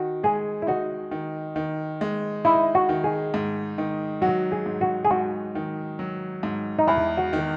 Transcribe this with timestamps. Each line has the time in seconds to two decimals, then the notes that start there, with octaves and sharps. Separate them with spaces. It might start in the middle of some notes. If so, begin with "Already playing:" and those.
Already playing: D#3 F#4
0.23 G#3 G#4
0.62 E4
0.67 D#4 F#4
1.11 D#3
1.56 D#3
2.01 G#3
2.45 D#4 E4
2.75 F#4
2.89 D#3
3.04 G#4
3.34 G#2
3.78 D#3
4.22 F#3 F#4
4.52 G#4
4.66 G#2
4.81 F#4
5.05 G#4
5.11 G#2 F#4
5.55 D#3
5.99 F#3
6.43 G#2
6.79 D#4
6.88 E2 E4
7.17 F#4
7.33 D#3